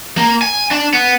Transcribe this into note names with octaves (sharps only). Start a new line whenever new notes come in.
A#3
G#5
D4
B3